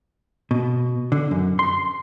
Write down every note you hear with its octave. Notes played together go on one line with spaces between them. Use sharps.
B2
D3
F#2
C6